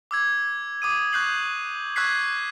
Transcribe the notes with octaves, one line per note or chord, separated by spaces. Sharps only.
D6 E6 G#6
D6 D#6 D#7
C#6 F#6 G6 C7 F#7
C#6 E6 F#6 G#6 B6 C7